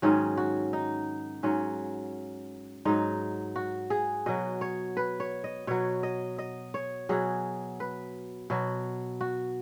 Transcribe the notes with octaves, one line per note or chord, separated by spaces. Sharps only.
G#2 D#3 F#3 C#4
F#4
D#4
G#2 F#3 C#4
G#2 F#3 D#4
F#4
G#4
B2 F#3 D#5
C#5
B4
C#5
D#5
B2 F#3 C#5
D#5
D#5
C#5
B2 F#3 G#4
B4
B2 F#3
F#4